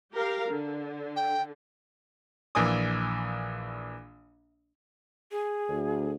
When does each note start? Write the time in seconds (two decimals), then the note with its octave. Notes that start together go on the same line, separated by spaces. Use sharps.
0.11 G4 A#4 F5
0.48 D3
1.16 G5
2.55 A#1 E3 A#3 D5 G#5 D#6
5.31 G#4
5.69 D2